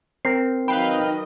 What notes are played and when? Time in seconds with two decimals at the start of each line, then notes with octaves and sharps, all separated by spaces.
0.25 C4 A#4 A#5 C7
0.68 D#3 F#3 B4 D#5 F5 G5 B5